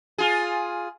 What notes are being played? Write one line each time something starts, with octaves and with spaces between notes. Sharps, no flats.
F4 G#4